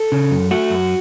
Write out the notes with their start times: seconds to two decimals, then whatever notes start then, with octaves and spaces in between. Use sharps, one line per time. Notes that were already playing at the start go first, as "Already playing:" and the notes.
Already playing: A4
0.12 C#3
0.31 F#2
0.51 A3 F#4
0.70 F#2